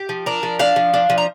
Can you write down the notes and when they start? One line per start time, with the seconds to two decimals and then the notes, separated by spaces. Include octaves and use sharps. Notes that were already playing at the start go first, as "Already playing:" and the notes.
Already playing: G4
0.09 F3
0.26 D4 A#4
0.43 F3
0.59 D4 F5
0.76 F3
0.94 D4
1.10 F3
1.18 A#5